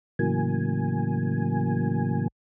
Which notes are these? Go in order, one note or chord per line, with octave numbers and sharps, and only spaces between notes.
A2 C#3 E3 F#3 A#3 G#5